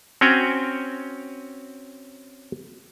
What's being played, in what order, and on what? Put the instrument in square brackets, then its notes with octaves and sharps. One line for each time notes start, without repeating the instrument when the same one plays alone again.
[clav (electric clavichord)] C4 C#4 F#4 C#5 G5 G#5